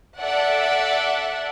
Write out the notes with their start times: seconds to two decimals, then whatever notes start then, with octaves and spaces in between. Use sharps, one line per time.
0.18 A4 D5 E5 F#5